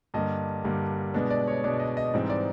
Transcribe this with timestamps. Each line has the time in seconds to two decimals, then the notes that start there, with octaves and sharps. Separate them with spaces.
0.14 G2 D3 G3 A#3 D#5
0.64 G2 D3 G3 A#3
1.14 B2 G#3 B3 D4
1.30 D5
1.47 C#5
1.64 B2 G#3 B3 D4 D5
1.80 D#5
1.97 D#5
2.14 G#2 E3 G3 C4 D#4
2.30 D5